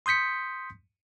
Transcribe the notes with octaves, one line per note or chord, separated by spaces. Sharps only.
C6 D#6 G6 B6 C#7